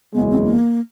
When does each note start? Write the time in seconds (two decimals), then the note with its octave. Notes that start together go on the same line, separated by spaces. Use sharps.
0.14 F#1 E2 C#3 E3 G#3 B3
0.31 C4
0.46 A#3